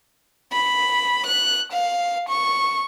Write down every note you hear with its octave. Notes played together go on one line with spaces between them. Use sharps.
B5
F#6
F5
C#6